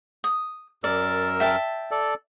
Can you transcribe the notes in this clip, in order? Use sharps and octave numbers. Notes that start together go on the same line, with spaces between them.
D#6
F#2 A#4 D5 E6
E5 G5 A5
A4 D5